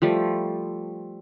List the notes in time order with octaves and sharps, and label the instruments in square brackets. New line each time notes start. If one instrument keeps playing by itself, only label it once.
[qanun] F3 G3 A3